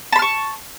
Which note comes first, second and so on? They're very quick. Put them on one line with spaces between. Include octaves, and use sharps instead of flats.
A5 B5 F6 C#6